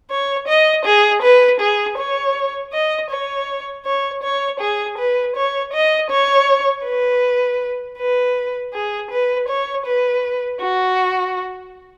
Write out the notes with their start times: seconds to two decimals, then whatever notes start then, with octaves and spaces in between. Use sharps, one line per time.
0.10 C#5
0.48 D#5
0.85 G#4
1.22 B4
1.60 G#4
1.98 C#5
2.73 D#5
3.10 C#5
3.85 C#5
4.23 C#5
4.60 G#4
4.98 B4
5.36 C#5
5.73 D#5
6.10 C#5
6.86 B4
7.98 B4
8.73 G#4
9.11 B4
9.48 C#5
9.86 B4
10.61 F#4